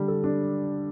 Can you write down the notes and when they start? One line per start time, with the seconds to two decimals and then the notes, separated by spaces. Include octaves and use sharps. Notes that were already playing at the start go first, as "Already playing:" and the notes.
Already playing: D3 G3 D4
0.08 A4
0.24 D4